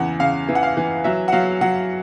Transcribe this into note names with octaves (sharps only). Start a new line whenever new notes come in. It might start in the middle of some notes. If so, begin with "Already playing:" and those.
Already playing: E2 C#3 F#5
C#3 F5
E3
F#5
F5
E3
F#3 E5
F#5
F#3 F5
F#3 F#5